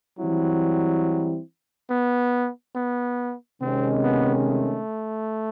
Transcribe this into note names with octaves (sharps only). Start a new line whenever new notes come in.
E3 F#3 G3 C4 E4
B3
B3
C3 D#3 G#3 C4 C#4
B3
A3